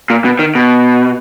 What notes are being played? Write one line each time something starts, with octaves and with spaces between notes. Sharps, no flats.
A#2
B2
D#3
B2